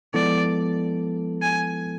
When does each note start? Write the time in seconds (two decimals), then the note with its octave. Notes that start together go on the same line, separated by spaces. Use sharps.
0.14 F3 G#3 B3 E4 A4 D5
1.42 G#5